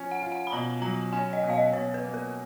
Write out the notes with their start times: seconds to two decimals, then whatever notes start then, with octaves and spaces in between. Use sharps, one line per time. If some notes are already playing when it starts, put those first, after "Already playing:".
Already playing: F3 C#4
0.11 F#5
0.22 F4
0.32 F#5
0.47 B5
0.52 B2 A#5
0.82 F#3 A#5
1.13 C#4 G#5
1.33 D#5
1.43 B2
1.50 F5
1.53 D#5
1.73 B2 C#5
1.94 B4
2.04 A#3
2.14 A#4